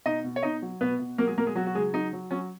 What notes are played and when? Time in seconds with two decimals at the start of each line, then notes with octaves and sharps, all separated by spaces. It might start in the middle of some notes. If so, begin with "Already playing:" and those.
0.06 B2 D#4 D#5
0.24 B2
0.36 C#5
0.43 B2 D#4 D#5
0.62 F#3
0.81 B2 B3 B4
0.99 B2
1.18 F#3 A#3 A#4
1.27 G#3 G#4
1.37 B2 A#3 A#4
1.46 G#3 G#4
1.55 F#3 F#4
1.66 F#4
1.75 C#3 G#3 G#4
1.94 F#3 D#4
2.13 F#3
2.31 F#3 C#4